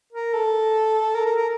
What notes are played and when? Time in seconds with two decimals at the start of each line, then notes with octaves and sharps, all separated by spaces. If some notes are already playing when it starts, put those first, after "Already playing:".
0.12 A#4
0.34 A4
1.15 A#4
1.26 A#4
1.36 A#4